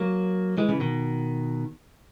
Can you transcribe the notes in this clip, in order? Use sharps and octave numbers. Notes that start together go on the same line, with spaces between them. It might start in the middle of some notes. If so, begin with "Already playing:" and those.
Already playing: F#3 A#3
E3 G#3
C#3 E3
B2 D#3